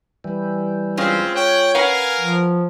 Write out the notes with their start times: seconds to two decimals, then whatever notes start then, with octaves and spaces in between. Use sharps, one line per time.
0.24 E3 G3
0.97 G#3 C4 C#4 F4
1.36 C#5 G5 F#6
1.75 C#4 A#4 B4 F5 F#5 G#5
2.21 F3